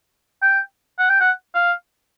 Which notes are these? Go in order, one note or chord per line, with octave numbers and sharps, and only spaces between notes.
G5
F#5
G5
F#5
F5